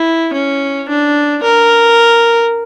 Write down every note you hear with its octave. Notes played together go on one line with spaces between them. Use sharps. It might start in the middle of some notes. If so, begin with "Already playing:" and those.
Already playing: E4
C#4
D4
A#4